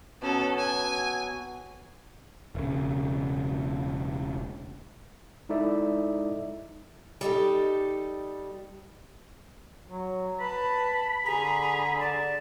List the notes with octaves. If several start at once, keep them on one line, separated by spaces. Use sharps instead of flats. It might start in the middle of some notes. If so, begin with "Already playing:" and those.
B2 F#3 C#4 A4
G#5
E1 C#3
G#3 D#4 E4 A4 D5 E5
G3 D#4 G4 A4
F#3
B4 A5 B5
D3 G#4 A#5
D5 A5